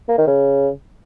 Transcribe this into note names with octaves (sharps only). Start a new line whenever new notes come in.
A#3
D#3
C#3